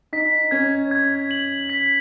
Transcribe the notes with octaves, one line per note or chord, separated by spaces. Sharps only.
D#4 B6
C#4 G#6
G#6
F#7
B6